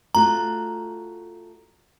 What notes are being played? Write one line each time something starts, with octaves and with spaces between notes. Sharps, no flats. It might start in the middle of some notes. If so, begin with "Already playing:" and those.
A3 F4 F#4 A#5